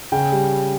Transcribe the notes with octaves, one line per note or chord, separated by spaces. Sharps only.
C#3 G5
G3